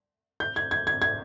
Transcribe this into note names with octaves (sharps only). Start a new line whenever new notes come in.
G6
G#6
G#6
G#6
G#6